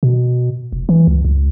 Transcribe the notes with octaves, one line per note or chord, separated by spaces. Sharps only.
B2
F1
E3
C#2
C#2